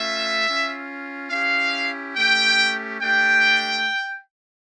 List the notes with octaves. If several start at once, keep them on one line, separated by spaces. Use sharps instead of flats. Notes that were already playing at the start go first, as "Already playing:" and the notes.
Already playing: A3 C#4 F4 E5
C#4 F4
C#4 E4 G4 F5
A3 C#4 G4 G5
A3 D4 G4 G5